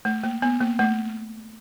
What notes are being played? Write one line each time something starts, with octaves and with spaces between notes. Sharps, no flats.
A3
A#3
B3
A#3
A3